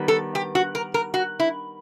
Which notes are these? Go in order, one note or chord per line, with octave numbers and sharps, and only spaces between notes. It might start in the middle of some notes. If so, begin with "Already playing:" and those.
Already playing: D#3 G3 B3
A4
G4
F#4
A#4
A#4
F#4
E4